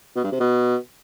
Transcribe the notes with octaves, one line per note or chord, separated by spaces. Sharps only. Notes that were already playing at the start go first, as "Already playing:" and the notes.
B2
G2
C3
B2